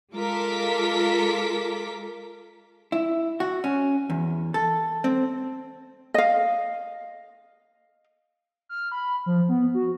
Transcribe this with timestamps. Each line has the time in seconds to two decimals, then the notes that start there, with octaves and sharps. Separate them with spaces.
0.14 G#3 F4 A4 A#4 D6 B6
2.92 E4
3.40 F#4
3.64 C#4
4.10 E2
4.54 A4
5.04 C4
6.14 D#5 F5
8.69 F6
8.92 B5
9.26 F3
9.49 B3
9.74 F#4